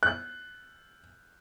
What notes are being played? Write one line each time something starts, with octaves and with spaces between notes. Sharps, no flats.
F#6